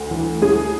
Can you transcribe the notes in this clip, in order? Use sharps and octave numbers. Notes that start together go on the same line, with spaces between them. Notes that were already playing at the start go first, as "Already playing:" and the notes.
Already playing: D2
E3
D2 G#4